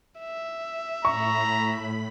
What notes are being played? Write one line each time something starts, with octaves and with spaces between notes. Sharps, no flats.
E5
A2 A#5 B5 C#6 B6